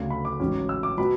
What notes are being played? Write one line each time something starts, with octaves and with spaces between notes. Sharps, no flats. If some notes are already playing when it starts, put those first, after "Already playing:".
Already playing: D2 C#3 F#3 A3 D4
B5
D6
A1 G#2 F#3 C#4
E6
D6
B2 F#3 B5